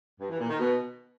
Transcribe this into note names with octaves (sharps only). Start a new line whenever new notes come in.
G2
E3
A#2
D#3
B2